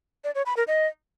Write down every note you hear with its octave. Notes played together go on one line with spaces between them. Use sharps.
D5
C#5
B5
A#4
D#5